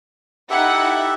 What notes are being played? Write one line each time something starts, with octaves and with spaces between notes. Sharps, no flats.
D#4 E4 G4 A4 E5 F#5